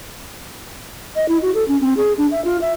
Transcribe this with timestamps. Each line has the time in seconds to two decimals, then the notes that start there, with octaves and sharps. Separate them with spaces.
1.16 D#5
1.29 E4
1.42 F#4
1.55 A4
1.68 C#4
1.80 C4
1.97 G#4
2.18 D4
2.31 E5
2.45 F4
2.62 E5